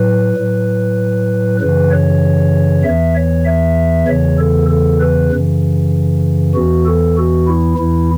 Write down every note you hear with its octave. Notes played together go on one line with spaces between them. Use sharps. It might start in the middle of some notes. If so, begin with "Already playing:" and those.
Already playing: A2 F#3 B4
A2 F#3
F#2 C#3 E3 B4
C#5
E2 E3 E5
C#5
E5
E2 C#3 E3 C#5
A4
A4
B4
F#2 C#3 E3
E2 E3 F#4
A4
F#4
E4
E2 E3 E4